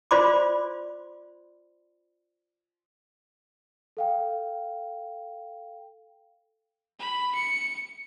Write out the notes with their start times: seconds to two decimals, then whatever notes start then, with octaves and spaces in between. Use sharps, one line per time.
0.11 F4 C5 D5 B5 C6 D6
3.97 A4 F5 G5
7.00 B5
7.35 C#7